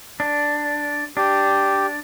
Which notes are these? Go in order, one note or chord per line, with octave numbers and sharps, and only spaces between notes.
D4
D4 G4